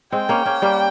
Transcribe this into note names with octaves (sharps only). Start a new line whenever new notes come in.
G#3 C4 G5
A#3 C#4
A#3 C#4
G3 A#3